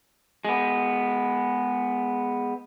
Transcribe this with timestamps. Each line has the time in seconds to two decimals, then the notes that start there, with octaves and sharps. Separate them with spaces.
0.45 G#3 B3